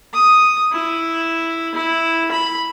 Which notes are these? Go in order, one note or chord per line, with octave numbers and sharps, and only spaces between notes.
D#6
E4
E4
B5